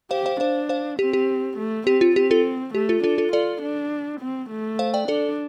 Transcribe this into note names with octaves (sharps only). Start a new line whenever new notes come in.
G4 C5 F5
C5 F5
D4 C5 F5
C5 F5
C4 G4
G4
A3
C4 G4
F4
C4 G4
F4 A4
A3 G4
F4 A4
D4 F4 A4
F4 A4
F4 A4 D5
D4
C4
A3
C5 F5
D5 G5
D4 A4 D5